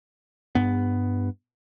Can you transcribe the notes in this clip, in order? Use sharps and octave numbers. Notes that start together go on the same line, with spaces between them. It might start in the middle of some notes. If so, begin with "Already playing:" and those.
G2 B3